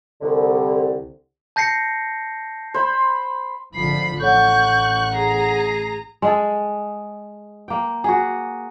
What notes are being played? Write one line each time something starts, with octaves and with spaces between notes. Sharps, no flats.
C2 D3
A5 G6 A#6 C7 C#7
C5 B5
G#1 D3 F3 B5 C7
A1 A4 C#5 F#5 C#6 F#6 G6
G#4 A#5 C7
G#3 G#4 A4
A#3 G5
F#4 G#4